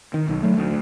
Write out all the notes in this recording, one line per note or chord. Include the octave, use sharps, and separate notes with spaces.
D#3
B1
F#3 A3
D2